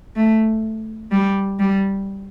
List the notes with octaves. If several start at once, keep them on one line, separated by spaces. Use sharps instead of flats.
A3
G3
G3